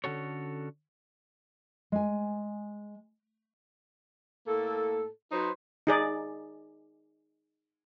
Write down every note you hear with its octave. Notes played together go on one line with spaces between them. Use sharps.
D3 C#4 F#4 A4 C#5
G#3 G#5
A2 A#3 A4
F#3 D#4 B4 C5
D#4 G#4 D5